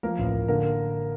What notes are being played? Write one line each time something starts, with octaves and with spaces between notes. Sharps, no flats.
F3 A#3 A#4
A1
A1
D3 A#3 A#4